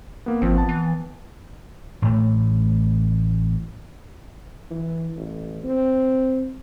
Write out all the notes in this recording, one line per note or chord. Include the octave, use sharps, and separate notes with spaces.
A#3 B3
G#1 F3 C4
B3 A5
E3
A1 A2 A3
E3
A1
C4